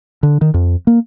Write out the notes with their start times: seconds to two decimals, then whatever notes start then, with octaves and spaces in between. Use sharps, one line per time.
0.23 D3
0.41 D#3
0.54 F2
0.87 A#3